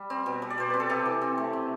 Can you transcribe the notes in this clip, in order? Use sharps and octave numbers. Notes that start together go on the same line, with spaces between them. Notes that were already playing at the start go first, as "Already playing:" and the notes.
Already playing: G3
C4
B2
G3
D5
B2 C5
C4 B4
A4
C3 G4
E3
C4
A3
C3